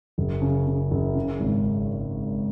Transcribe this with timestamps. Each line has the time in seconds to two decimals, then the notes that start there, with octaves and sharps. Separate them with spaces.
0.18 F#1
0.42 C#3
0.67 C#3
0.91 F#1
1.15 C#3
1.40 G#1